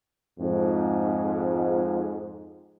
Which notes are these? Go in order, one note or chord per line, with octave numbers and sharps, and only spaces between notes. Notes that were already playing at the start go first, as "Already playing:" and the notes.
F2 G#2